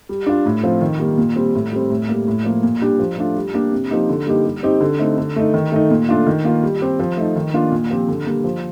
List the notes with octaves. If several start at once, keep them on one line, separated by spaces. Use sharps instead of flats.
G3
D4 F4
A2
F3 C4 F4
D#3
G3 A#3
A#2
G3 C4
A2
G3 C4
A2
G3 A#3
A2
F3 A#3
A#2
G3 D4 G4
F3
A3 D4 F4
G3
A#3 D4 G4
C3
F3 A#3 D#4 G4
D3
G3 A#3 D#4 G4
G3
C4 D#4 G4
D3
A3 C4 D#4
D3
A3 D#4
D#3
A3 D#4
A#2
A3 D4 F4
D#3
A#3 F4
G3
C4 G4
F3
A3 D#4
D#3
A#3 D4 F4
A#2
F3 C4 G4
D3
G3 A#3
F3